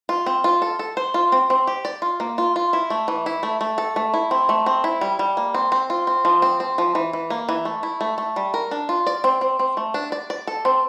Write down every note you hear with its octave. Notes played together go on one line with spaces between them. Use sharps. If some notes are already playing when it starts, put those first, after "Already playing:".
F4
C4
F4
A4
A4
C5
F4
C4
C4
G4
D5
F4
A#3
F4
F4
E4
A3
E3
E4
A3
A3
A4
A3
E4
C4
A3
C4
E4
G3
G3
A#3
C4
C4
F4
C4
F3
C4
C4
F3
E3
E3
A#3
E3
A3
E4
A3
A3
G3
A#4
D4
F4
D5
C4
C4
C4
A3
D4
D5
D5
A4
C4